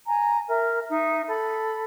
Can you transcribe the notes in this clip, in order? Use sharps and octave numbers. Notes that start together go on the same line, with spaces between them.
G#5 A#5
A#4 E5
D#4 E5
A4 B5